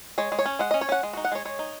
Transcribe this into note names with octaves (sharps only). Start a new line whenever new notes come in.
G#3 C#5
G#3
C#5
C#4
G#3 F#5
C#4 D#5
C#5
C#4 F#5
G#3
D#4 F#4
F#5
G#3 C#5
G#3 C#5
D#4